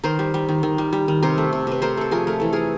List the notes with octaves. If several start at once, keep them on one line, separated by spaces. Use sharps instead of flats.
D#3 A#4 C5
G3
G3
D#3
D#3
G3
G3
D#3
C3 A#4 C5
A3
C3
C3 B4
A3 A#4 C5
A3 A4
F3 G#4 A#4
A3 A#4
E3 A4
A3 G#4 A#4